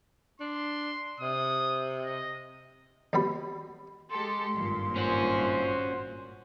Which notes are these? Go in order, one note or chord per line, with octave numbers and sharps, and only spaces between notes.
D4 C6
C3 D#6
D#5
D#2 B2 G3 B5
G#3 G4 A4 C6
G#1 G2 A#2
C#4 F#4 C5